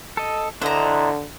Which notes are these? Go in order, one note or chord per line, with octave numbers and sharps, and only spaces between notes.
A4 D#5
D3 D4 E4 C5 D#5 A#5